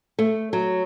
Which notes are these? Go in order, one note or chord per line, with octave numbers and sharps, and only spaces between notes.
A3
F#3